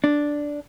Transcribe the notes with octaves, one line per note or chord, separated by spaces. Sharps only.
D4